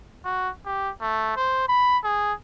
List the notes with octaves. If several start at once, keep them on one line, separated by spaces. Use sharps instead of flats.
F#4
G4
A3
C5
B5
G#4